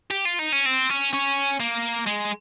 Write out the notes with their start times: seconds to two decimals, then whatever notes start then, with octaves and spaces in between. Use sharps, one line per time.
0.11 G4
0.25 F4
0.39 D#4
0.52 C#4
0.66 C4
0.90 C#4
1.13 C#4
1.60 A#3
2.06 G#3